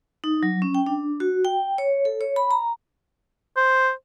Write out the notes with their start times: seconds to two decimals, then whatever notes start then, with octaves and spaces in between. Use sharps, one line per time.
0.24 D#4
0.43 F#3
0.62 C#4
0.75 G5
0.86 D4
1.20 F#4
1.45 G5
1.78 C#5
2.05 A4
2.21 C#5
2.36 B5
2.51 A#5
3.57 C5